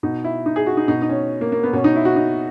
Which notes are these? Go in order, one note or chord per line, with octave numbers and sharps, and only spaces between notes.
B2 D#4
E4
D#4
G#4
F#4
D#4
B2 D#4
D#4
C#4
A#3
A#3
B3
B2 C#4
D#4
E4
F#4
D#4